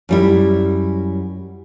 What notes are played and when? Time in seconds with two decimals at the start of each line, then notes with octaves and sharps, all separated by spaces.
0.09 F#2 G3 E4